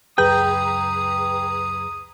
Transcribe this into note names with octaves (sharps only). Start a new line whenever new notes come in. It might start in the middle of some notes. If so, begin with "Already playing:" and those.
C#2 F#2 G#4 B4 G5 A#5 D#6 G6